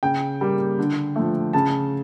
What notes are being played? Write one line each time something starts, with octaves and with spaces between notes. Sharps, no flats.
C#3 G5
G3 A#3
D3
F3 A3
C#3 A5